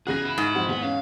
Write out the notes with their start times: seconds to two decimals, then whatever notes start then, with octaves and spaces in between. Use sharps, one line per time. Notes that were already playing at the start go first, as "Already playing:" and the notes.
0.07 E2 C#3 F#4 G#4 F#6 A#6
0.25 E4
0.38 G#2
0.55 F2 C4 F#4
0.69 E2 B3
0.82 C#4 F5